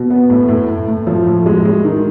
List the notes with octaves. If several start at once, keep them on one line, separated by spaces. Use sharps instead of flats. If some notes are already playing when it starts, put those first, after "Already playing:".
Already playing: B2
B3
A2
A2
A2
A2
F3
A2
G#3
G#3
D#3